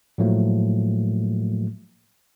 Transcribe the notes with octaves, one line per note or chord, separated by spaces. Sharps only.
A2 F3 F#3 A3 A#3